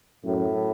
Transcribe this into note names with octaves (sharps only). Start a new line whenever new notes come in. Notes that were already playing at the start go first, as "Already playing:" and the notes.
F#2 A2